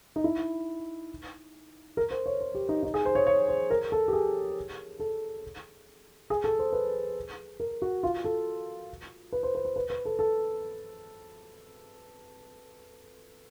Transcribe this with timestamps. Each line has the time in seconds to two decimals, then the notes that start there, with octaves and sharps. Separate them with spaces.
0.16 D#4
0.24 E4
1.97 A#4
2.11 C5
2.26 C#5
2.41 C5
2.55 G4
2.69 D#4
2.83 D#4
2.94 G#4
3.05 C5
3.15 C#5
3.27 C#5
3.48 C5
3.70 A#4
3.92 A4
4.08 G4
4.13 G#4
5.00 A4
6.30 G#4
6.44 A4
6.59 C5
6.73 B4
7.60 A#4
7.82 F#4
8.03 F4
8.24 A4
9.32 B4
9.43 C5
9.55 B4
9.65 C5
9.76 B4
9.90 B4
10.05 A4
10.19 A4